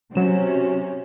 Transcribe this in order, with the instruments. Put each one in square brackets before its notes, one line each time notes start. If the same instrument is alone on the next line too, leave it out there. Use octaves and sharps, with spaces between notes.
[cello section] C3 C#4 [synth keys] F#3 E7